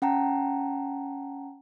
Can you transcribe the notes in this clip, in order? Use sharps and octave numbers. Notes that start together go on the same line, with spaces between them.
C#4 F#5 G5 A5 A#5